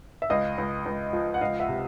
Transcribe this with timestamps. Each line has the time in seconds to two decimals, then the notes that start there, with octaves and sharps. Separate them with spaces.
0.22 E5
0.30 C#2 D#5 F5
0.58 C#2
0.86 C#2
1.13 F3
1.34 F#5
1.41 C#2 D#5 F5
1.60 E5 F#5
1.68 C3